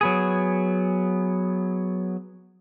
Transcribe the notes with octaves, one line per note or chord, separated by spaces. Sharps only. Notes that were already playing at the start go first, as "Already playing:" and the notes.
F#3 B3 G#4